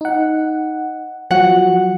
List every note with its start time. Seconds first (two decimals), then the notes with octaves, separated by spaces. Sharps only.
0.01 D#4 F#5
1.31 F3 F#3 F#4 F#5